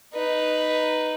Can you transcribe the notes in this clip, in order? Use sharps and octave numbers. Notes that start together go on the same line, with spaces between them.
D#4 B4